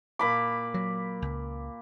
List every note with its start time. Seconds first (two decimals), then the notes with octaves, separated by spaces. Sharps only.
0.19 A#2 B5 D6
0.74 F#3
1.22 C#2